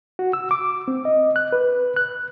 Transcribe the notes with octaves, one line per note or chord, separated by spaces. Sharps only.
F#4
E6
D6
C4
D#5
F#6
B4
F#6